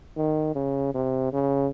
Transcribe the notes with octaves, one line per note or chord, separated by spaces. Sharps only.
D#3
C#3
C3
C#3